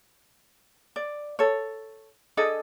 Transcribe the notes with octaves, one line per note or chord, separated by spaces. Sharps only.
D5
A4 C#5
D4 G#4 A4 D#5